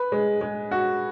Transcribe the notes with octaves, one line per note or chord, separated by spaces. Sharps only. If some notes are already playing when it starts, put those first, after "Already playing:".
Already playing: B4
G#3
G#3
F#4